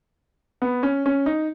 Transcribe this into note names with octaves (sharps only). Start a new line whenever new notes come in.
B3
C#4
C#4
D#4